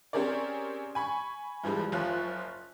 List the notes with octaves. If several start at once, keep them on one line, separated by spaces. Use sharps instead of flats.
C4 C#4 G4 G#4 A#4 D5
G#5 B5 C#6
G2 E3 F3 G3 G#3
F#1 F3 F4 C#5 F#6